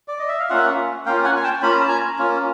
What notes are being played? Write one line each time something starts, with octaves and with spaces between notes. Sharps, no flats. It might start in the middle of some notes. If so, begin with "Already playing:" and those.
D5
D#5
E5
F5
A#3 C#4 F4 E5 F#5
A#3 C#4 F4 F5 G5
F#5 G#5
G#5
G5 A5
A#3 C#4 F4 B5
A#5
A5
G#5 A#5
A#3 C#4 F4